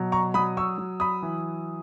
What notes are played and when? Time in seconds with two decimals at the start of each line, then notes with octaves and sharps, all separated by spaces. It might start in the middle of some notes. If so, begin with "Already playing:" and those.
Already playing: B2 F#3
0.12 A#5 C#6
0.34 F#3 B5 D#6
0.57 C#6 E6
0.78 F#3
1.00 B5 D#6
1.23 E3